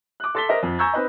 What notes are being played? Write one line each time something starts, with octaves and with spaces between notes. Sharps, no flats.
D6 F#6
A4 C6 A6 B6 G7
A#4 C5 D#5 E5
F2
G#5 A#5 C#6 E6 G6 G#6
C4 D#4 B4 D#5